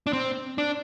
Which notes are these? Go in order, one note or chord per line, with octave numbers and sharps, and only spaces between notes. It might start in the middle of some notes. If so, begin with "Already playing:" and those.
D4
C4
D4